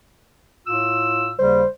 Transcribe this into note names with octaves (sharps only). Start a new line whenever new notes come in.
A2 F4 E6
D#2 C#3 G3 C5